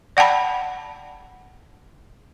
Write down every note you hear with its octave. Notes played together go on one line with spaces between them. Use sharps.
D5 F#5 G5 A5 B5